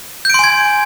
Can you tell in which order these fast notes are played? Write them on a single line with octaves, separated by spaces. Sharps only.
G6 D7 C6 G#5 G#6